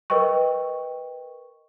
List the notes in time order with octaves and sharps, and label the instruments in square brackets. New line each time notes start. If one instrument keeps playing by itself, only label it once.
[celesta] A#4 B4 D#5 G5 C#6